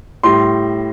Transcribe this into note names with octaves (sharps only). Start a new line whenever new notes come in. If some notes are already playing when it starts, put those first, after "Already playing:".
A2 G3 C6